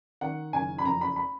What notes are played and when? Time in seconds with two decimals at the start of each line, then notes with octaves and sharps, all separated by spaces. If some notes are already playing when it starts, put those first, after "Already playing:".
0.21 D#3 F#5
0.53 F#1 G#5
0.78 B5
0.84 F2 A#5
1.01 B5
1.16 B5